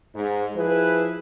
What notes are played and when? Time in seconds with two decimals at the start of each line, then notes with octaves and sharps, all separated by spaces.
0.15 G#2
0.55 F3 E4 G#4 B4